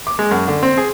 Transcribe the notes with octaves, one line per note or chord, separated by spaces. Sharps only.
D6
G#3
F#2
D3
C4
G#4